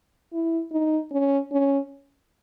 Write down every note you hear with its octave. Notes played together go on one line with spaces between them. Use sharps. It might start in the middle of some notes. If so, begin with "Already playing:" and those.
E4
D#4
C#4
C#4